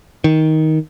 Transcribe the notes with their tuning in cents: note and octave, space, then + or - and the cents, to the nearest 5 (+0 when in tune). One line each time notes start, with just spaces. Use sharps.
D#3 +15